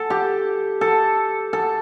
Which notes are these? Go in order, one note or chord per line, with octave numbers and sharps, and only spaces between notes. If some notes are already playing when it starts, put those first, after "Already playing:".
Already playing: A4
G4
A4
A4